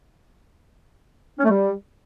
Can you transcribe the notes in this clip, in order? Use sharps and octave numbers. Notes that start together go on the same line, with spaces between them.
C#4
A3
G3